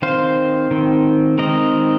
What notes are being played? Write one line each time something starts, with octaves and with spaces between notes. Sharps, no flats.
D#3 C4 C5 F5
D#3 C4
D#3 G#3 C4 A#4 D#5